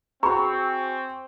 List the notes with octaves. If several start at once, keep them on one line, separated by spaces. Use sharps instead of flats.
C4 F#4 G#4 A#5 B5 C#6